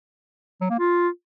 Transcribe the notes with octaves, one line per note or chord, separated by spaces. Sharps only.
F#3
A#3
F4